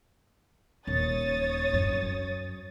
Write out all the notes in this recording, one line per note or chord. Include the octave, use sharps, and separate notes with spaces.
D#1 C#5 D#6 A6
F#2